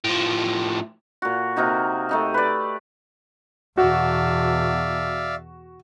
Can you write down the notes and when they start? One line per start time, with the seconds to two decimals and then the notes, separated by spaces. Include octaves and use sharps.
0.04 A2 F3
1.22 A#2 F#4
1.56 C3 A#3 D#4 F#4
2.09 A3 D#4 G4
2.34 B4 D5
3.77 E2 B2 F#4 D5 E5 F5